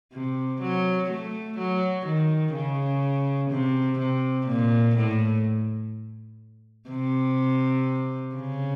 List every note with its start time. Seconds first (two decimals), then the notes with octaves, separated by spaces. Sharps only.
0.13 C3
0.62 F#3
1.10 A3
1.57 F#3
2.06 D#3
2.54 C#3
3.51 C3
3.99 C3
4.47 A#2
4.96 A2
6.90 C3
8.35 C#3